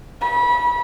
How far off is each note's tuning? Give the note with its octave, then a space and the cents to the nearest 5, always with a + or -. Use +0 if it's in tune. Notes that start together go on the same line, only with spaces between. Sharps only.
B5 -30